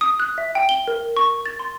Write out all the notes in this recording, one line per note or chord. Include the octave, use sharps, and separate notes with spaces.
D#6
F#6
E5
G5
G7
A#4
C#6
A6
C6